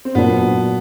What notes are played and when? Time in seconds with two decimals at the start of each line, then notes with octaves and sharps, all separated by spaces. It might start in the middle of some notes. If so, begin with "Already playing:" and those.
0.05 C4
0.15 A#2 F#3 A#3 B3 D4 F4